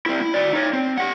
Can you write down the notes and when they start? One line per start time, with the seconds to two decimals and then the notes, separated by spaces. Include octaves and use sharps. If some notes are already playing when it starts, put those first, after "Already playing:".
0.06 C4 E4
0.21 E4
0.34 F#4 D5
0.53 D#4 C#5
0.73 C4
0.97 G4 F#5